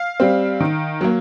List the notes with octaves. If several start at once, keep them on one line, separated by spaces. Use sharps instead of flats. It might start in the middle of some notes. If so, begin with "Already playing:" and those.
Already playing: F5
G3 C4
D#3
F#3 A#3